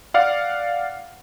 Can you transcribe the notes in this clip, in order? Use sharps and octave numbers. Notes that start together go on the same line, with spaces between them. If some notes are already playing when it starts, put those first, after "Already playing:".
D5 F5 F#5